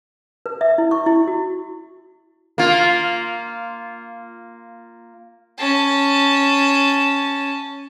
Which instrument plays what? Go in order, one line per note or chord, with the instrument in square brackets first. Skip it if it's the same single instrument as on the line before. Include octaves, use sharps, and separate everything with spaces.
[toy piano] B4
E5
E4
C#6
E4
F#4
[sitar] A#3 F4
[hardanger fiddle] C#4 A5